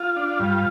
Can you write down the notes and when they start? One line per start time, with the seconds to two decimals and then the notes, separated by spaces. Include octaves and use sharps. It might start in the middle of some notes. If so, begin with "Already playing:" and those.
Already playing: F4
0.16 D4
0.40 G2